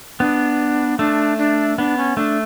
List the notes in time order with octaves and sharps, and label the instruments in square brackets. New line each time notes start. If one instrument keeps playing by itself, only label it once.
[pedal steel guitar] B3 [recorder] D4
[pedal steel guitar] A3 [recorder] D4
[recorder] D4
[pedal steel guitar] B3 [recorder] D4
[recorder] C#4
[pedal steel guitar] A3 [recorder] D4